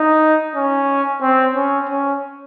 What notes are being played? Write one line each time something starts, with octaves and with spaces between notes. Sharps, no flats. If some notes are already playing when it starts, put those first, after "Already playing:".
Already playing: D#4
C#4
C4
C#4
C#4